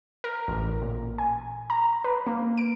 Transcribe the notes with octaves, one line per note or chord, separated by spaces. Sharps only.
A#4
A1
A#2
G#5
A#5
B4
A#3
D7